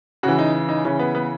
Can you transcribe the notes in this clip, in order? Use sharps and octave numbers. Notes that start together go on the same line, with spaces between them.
C#3 E3 F#4
D#4
D#4
C#3 E3 C#4
B3
B3